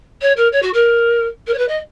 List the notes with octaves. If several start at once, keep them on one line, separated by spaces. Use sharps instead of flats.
C#5
A#4
C#5
F#4
A#4
A#4
C#5
B4
D#5